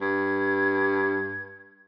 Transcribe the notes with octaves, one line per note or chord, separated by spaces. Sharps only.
G2 G#6